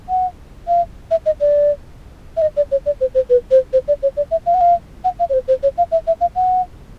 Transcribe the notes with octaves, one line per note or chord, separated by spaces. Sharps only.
F#5
F5
E5
D#5
D5
E5
D#5
D5
C#5
D5
C5
C5
B4
C5
C5
D5
C#5
D5
E5
F5
F#5
F5
F#5
F5
C#5
C5
C5
C#5
F5
E5
E5
F5
F#5